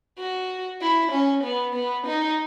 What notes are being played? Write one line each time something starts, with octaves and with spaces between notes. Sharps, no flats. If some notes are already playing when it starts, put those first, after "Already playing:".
F#4
E4
C#4
B3
B3
D#4